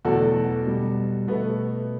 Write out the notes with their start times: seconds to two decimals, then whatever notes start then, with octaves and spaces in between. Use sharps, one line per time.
0.05 E2 B2 F#3 A3 F#4 A4
0.66 B2 G3
1.28 B2 A3 B3